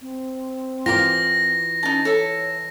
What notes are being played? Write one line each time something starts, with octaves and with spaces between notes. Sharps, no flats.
C4
E3 F4 G4 A#4 D5 A#6
C#4 D#4 A5
A4 C#5 E5